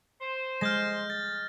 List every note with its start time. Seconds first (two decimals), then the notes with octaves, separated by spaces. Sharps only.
0.21 C5
0.61 G#3 F6 G6 A#6
1.10 A6